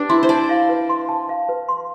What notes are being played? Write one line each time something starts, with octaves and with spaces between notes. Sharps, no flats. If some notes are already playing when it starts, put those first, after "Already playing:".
Already playing: D4 G4 B4
E4 C6
C5
D5 A5
F5
B4
C6
A5
F5
B4
C6